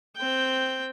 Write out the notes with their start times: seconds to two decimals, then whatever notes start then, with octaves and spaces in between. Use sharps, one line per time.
0.16 C4 G5